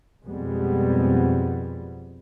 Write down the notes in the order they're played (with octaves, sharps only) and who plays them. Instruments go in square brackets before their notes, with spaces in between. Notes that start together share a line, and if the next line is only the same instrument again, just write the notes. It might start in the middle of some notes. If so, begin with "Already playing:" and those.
[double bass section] F2 B2 G3 G#3 B3